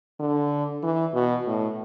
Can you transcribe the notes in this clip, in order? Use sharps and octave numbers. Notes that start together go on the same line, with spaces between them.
D3
E3
B2
A2